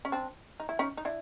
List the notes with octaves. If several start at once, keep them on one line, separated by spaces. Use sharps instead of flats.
C#4
C4 D4
D#4
E4
C#4 D#4
D#4
D4 E4